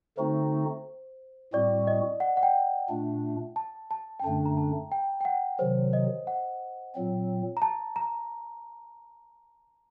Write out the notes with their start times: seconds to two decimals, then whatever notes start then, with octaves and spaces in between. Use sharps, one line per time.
0.18 D3 A3 C4 D#4 F#4 C5
1.53 A2 G3 C4 F#4 D5
1.87 D#5
2.20 F#5
2.37 F#5
2.43 G5
2.89 A#2 A3 D4
3.56 A5
3.91 A5
4.20 G5
4.24 F#2 D3 A3 D4 A5
4.46 A#5
4.57 A5
4.92 G5
5.21 G5
5.25 F#5
5.59 C3 D#3 F#3 C5
5.93 D#5
6.27 F#5
6.95 A#2 F#3 C4
7.57 A#5
7.62 A5
7.96 A#5